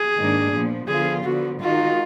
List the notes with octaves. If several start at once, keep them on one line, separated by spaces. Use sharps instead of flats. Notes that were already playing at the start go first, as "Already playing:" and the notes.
Already playing: G#4
G#2 D#3 A#3 D4
A#2 F3 B3
D3 F3 B3 F4 G#4
D3 F3 B3 F#4
D#3 G#3 D#4 F4 F#4